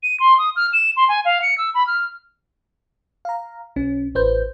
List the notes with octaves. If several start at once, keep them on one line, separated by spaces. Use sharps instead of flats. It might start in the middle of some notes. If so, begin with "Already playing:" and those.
D#7
C6
D#6
F6
E7
C6
G#5
F5
C#7
E6
B5
F6
F5 A#5
B1 C#4
A1 B4 C5 G6